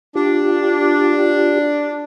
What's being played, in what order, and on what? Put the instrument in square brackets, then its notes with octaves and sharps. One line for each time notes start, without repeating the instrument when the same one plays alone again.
[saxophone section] D4 [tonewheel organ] F4 G4